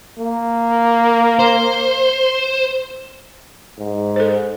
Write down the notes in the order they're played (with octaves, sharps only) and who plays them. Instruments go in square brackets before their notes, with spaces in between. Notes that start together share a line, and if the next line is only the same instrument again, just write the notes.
[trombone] A#3
[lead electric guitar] C5
[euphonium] G#2
[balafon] A4 C5